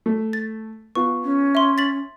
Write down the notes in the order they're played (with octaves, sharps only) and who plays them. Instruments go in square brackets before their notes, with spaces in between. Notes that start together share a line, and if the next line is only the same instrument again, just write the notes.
[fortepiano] A3
[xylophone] A6
[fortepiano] B3 F4 [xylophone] C#6
[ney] C#4
[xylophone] E5 C6
A6 B6 F#7